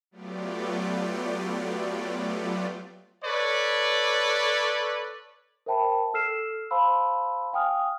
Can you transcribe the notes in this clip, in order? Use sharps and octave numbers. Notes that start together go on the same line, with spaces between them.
F#3 A3 B3 F4 G4 D5
A4 B4 C#5 D5
A#4 C5 E5 G5 A5 B5
A4 E6 F6 C7 E7
C5 F5 A5 B5 C6 E6
F5 G5 G#5 D#6 F6